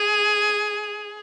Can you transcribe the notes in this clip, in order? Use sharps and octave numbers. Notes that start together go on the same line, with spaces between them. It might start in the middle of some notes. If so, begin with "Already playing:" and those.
Already playing: G#4